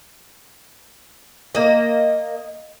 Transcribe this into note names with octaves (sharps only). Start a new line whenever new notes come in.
A#3 D#5